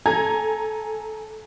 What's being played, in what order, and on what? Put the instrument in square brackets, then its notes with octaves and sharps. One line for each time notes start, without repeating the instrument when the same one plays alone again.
[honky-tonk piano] A4 G#5 A#5 G#6